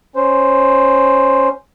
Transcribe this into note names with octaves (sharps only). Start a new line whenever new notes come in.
C#4 C5